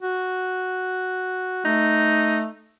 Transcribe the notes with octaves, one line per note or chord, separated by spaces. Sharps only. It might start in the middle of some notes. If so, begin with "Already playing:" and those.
F#4
A3 D#4